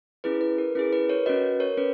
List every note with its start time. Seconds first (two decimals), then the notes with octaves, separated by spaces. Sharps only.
0.24 C#4 E4 G#4 B4
0.41 B4
0.58 A#4
0.75 C#4 E4 G#4 B4
0.93 B4
1.09 A#4 C#5
1.26 C#4 F#4 B4 D#5
1.60 A#4 C#5
1.77 C#4 B4